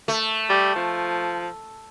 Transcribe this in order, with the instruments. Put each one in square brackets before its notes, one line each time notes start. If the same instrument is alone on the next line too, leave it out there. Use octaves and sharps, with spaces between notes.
[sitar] A3
[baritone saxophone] G3
F3